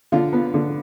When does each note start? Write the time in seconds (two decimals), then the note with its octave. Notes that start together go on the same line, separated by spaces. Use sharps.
0.12 D3 F4
0.33 B3
0.54 D3